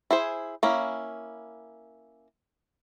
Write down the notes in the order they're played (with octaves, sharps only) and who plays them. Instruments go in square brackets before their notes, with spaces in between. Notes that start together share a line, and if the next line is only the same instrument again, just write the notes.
[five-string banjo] E4 G#4 C5
A#3 C#4 E4